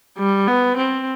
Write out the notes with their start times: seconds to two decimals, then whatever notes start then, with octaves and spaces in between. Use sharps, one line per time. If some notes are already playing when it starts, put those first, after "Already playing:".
0.18 G3
0.47 B3
0.77 C4